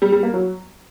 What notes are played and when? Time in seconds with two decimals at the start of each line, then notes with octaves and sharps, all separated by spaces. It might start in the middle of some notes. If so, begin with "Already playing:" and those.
0.02 G3
0.12 G3
0.23 A#3
0.34 F#3